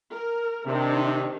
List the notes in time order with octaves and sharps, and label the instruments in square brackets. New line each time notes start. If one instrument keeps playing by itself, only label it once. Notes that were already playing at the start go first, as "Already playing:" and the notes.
[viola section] A#4
[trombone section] C3 [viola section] D#3 D4 D#4